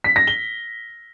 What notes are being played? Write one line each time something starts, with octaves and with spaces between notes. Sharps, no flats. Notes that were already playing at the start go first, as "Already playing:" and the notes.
B6
A#6
G7